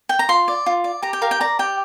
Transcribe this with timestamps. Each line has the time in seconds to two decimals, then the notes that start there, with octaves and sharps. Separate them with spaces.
0.09 G5
0.19 A#5
0.29 F4 C6
0.48 D5
0.66 F4
0.84 D5
1.02 G4 A#5
1.13 G5
1.22 A#4 F5
1.31 G5
1.40 D5 A#5
1.59 G4 G5